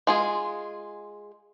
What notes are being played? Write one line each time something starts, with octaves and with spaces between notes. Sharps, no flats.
G#3 F4 G#4